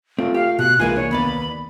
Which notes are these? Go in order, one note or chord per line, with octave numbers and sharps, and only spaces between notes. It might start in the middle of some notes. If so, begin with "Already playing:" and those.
A3 C4 F4
G4 F5
B2 F#6
C2 E3 G#3 A#3 F4 G#5
D4 C#5
D#2 B3 D5 B5